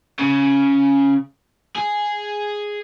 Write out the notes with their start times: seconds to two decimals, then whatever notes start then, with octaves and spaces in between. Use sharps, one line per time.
0.19 C#3
1.75 G#4